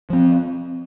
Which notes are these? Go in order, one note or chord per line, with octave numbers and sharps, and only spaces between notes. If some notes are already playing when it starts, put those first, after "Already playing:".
F3 C4